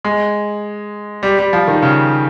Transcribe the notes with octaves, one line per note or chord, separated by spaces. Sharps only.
G#3
G3
G3
F3
D#3
C#3